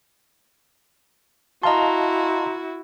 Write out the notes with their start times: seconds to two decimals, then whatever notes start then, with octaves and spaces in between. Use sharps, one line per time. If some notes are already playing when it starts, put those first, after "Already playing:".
1.63 E4 F#4 D#5 F5 A5 A#5 C6